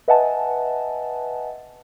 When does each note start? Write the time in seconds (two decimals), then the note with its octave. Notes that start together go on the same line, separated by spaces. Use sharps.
0.08 B4 D#5 E5 F#5 G#5 A5